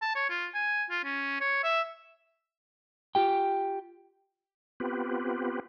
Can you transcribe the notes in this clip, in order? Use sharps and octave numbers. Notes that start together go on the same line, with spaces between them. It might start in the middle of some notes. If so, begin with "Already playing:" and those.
A5
C#5
F4
G#5
F4
C#4
C#5
E5
F4 G4 G5
B3 C4 F4 G4 B4